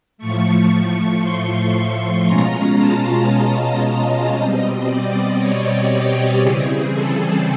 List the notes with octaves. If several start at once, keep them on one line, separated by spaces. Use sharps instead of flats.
A2 F3 A3 C#6
C6
B2 G#3 C#4 F4 A#5
A5
D#5
D#5
B2 G3 C4 D#5
D5
C#5
G4
C#3 E3 G3 C4 G#4
A4